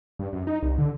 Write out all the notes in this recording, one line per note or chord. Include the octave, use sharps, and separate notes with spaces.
G2
F#2
D#4
C2
D3